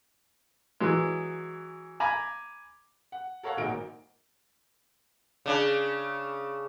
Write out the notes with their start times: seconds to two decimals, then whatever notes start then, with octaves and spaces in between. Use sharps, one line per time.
0.80 E3 F#3 G#3
2.00 G#5 A#5 B5 D6
3.12 F#5
3.43 A4 A#4 C#5 F5 F#5
3.57 G#1 A#2 D#4 F#4 A#4 D7
5.46 C#3 D4